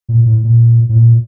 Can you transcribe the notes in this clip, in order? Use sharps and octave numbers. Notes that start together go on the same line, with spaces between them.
A#2
A2
A#2
A2
A#2